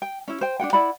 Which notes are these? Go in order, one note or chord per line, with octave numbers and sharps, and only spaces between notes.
G5
C#4 E4
C5 G5
D4 F4 F#5 G5
E4 D5 F#5 B5